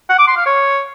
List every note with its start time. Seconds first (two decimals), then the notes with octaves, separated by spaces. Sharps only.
0.10 F#5
0.19 D6
0.28 C6
0.37 F5
0.46 C#5